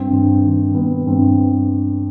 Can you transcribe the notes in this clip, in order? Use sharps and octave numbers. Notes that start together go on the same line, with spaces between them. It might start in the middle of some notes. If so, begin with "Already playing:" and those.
Already playing: G2 C4
G2
D#3
G2 B3
G2 C4